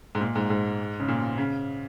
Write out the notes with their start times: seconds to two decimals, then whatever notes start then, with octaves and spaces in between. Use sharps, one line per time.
0.15 G#2
0.21 A#2
0.35 G#2
0.50 G#2
1.00 C#3
1.08 A#2
1.38 C#3